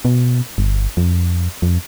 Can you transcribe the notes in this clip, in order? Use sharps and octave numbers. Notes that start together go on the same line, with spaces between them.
B2
G1
F2
F2